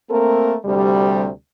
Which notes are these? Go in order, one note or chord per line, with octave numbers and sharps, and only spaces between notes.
A3 A#3 C4 A4 A#4
D2 C3 G3